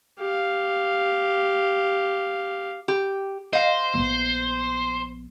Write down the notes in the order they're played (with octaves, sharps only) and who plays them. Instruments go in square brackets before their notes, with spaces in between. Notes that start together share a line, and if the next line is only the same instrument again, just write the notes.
[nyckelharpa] G4 F5
[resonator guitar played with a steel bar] G4
[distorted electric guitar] C5 [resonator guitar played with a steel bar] D#5 F5
[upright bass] A#1 B3